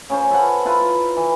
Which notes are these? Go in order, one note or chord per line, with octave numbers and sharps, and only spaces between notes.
C#3 C#4 C5
A4 B4 C5 F#5
E4 F4 A#4 B4
E3